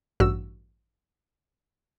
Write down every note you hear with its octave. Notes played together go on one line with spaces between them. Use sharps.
A1 G2 F#4 E6